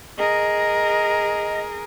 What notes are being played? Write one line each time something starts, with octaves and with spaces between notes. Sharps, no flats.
G#4 A#4 D#5